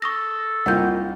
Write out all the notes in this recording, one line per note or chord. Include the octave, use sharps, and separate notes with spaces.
A4 C#6 D#6 A#6
C2 A#3 D#4 F4 F#5 G6